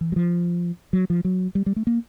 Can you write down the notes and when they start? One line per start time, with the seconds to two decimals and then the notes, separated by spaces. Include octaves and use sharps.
0.01 E3
0.12 F#3
0.16 F3
0.93 F#3
1.10 F3
1.25 F#3
1.55 G3
1.66 G3
1.76 A3
1.87 A#3